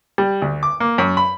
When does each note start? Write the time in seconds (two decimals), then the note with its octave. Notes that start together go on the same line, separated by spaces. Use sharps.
0.18 G3
0.42 D2
0.63 D6
0.80 A#3
0.98 F#2
1.17 B5